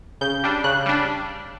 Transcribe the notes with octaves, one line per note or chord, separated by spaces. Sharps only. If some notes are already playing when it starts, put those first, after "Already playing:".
C#3 G6
G3 D4
C#3 F#6
G3 D4